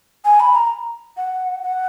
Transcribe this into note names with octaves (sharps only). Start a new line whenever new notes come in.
G#5
B5
A#5
F#5
F#5